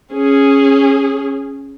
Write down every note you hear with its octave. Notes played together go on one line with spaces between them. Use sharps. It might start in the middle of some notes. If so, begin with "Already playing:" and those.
C#4 G#4